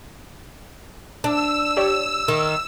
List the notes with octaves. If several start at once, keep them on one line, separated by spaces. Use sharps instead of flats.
D4 E6
G4 C#5 D5
D#3